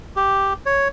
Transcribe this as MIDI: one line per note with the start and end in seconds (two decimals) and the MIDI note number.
0.16 0.53 67
0.66 0.88 73